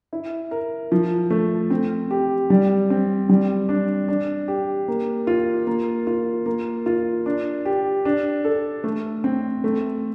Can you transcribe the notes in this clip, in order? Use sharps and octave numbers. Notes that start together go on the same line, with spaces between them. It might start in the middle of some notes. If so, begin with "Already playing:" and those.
E4
A#4
F3
A3
C4
G4
G3
C4
G3
D4
D4
G4
A#3
F4
A#3
F4
A#3
F4
D4
G4
D4
A4
A3
C4
A3